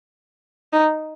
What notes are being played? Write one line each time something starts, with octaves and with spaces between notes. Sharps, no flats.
D#4